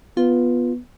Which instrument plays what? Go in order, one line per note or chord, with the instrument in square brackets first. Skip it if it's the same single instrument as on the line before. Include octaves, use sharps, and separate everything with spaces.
[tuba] B3 [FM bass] F4